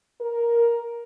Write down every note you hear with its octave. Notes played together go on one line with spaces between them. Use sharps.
A#4